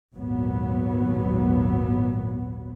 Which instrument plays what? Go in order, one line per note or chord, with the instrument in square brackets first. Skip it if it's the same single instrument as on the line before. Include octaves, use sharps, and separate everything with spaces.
[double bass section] G#1 D#2 A#2 F#3 B3